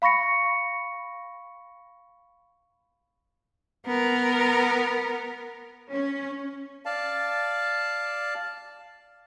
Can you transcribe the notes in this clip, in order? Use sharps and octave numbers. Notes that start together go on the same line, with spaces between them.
F5 B5 C#6 A#6 C#7
B3 A#4
C#4
D5 F5 A5